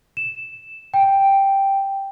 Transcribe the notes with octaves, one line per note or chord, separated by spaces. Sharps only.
E7
G5